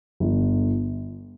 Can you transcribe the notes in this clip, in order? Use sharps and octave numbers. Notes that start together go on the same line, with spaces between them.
G1